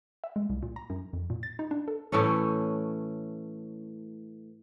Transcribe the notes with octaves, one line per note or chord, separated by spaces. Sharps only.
E5
G#3
C2
A#2
A#5
F#2
F2
A#2
A6
D#4
D4
A4
A2 E3 A3 C#4